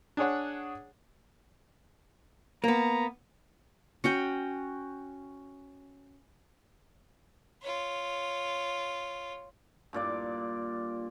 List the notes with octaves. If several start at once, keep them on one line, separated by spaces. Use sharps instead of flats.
D4 G#4 C#5 F#5
A#3 B3 A#5
C#4 F#4 G5
F4 C#5
G2 A#2 D5 D6